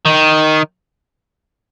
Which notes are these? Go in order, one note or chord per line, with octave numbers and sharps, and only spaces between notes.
D#3